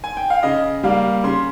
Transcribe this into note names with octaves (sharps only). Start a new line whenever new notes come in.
G#5
G5
F5
C#3 D#5
G3 A#3 F5
C#3 C6